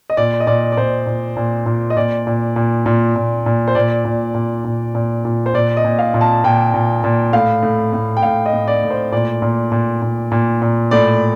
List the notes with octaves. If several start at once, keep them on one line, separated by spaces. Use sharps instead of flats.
D#5
A#2 D5
D#5
A#2 D5
D5
A#2 C5
A#2
A#2
A#2
D#5
A#2 D5
A#2
A#2
A#2
A#2
A#2
C5
A#2 D5
A#2
A#2
A#2
A#2
A#2
C5
A#2 D5
D#5
A#2
F5
A#2
A5
A#2 G5
A#2
A#2
A2 F5
A2
A2
G5
A2 F5
D#5
A2
D5
A2
C5
A#2 D5
A#2
A#2
A#2
A#2
A#2
A2 D5